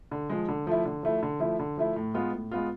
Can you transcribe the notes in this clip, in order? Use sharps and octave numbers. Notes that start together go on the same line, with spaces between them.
D3
F3 G#3
D3
F3 A3 E4
D3
F3 A3 E4
D3
F3 A3 E4
D3
F3 A3 E4
A2
G#3 B3 F4
A2
G#3 B3 F4